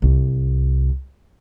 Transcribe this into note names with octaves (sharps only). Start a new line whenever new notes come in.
C2